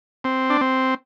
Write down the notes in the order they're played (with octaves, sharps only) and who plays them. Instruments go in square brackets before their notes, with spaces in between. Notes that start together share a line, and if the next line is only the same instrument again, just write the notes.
[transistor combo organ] C4
D4
C4